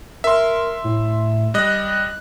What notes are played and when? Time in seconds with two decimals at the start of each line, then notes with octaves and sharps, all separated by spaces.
0.24 A#4 E5 C6
0.84 A2
1.54 G3 D#5 F#6